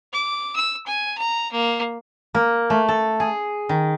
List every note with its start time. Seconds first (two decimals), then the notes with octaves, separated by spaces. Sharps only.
0.13 D6
0.56 E6
0.87 G#5
1.18 A#5
1.52 A#3
2.35 A#3
2.70 A3
2.88 A4
3.20 G#4
3.69 D#3